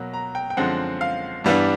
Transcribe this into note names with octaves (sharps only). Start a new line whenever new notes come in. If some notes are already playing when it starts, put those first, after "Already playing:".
Already playing: B2 F#3 A#3
A#5
G5
G5
F#2 D3 F3 G#3 C4 F#5
F5
G2 E3 G3 B3 D4